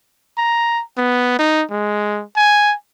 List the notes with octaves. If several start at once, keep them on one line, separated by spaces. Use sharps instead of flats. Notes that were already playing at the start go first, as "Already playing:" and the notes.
A#5
B3
D#4
G#3
G#5